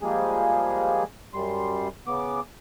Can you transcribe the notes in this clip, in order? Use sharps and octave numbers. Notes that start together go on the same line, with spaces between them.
F3 G3 G#3 A#3 G#4
F#2 G3 C6
C#3 B3 D6